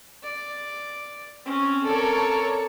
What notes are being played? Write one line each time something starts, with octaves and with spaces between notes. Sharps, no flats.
D5
C4 C#4
A4 A#4 C#5 D5